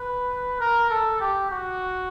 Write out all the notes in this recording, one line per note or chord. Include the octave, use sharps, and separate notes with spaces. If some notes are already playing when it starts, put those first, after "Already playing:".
Already playing: B4
A#4
A4
G4
F#4